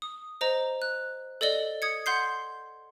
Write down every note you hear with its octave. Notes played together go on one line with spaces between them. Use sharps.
D#6
C5 D#5 A#5
F#6
A4 D5 D#5 G7
D#6 G#6 C#7
F#5 C6 G6 C7